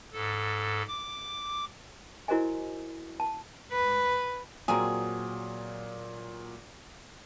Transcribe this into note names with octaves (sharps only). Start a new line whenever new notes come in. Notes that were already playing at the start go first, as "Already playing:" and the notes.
G#2 A4
D6
E4 F#4 A#4 C5 D#5 G#5
A5
B4
A#2 F#3 A#3 C4 G#4